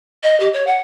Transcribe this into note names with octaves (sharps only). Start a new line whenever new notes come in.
D#5
G4
C#5
F#5